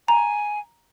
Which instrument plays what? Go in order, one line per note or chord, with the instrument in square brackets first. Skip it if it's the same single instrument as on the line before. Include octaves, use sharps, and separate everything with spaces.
[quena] G#5 [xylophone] A#5